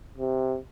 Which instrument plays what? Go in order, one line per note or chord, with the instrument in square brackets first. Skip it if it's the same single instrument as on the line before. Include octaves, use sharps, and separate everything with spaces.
[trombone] C3